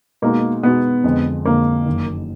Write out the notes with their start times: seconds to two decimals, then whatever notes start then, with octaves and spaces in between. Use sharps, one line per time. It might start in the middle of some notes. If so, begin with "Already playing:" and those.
0.22 B2 G#3 A#3 D#4 F#4
0.63 B2 G#3 B3 D#4 F#4
1.04 F2 D3 G#3
1.45 F2 D3 G#3 A#3
1.86 F#1 F#2 D#3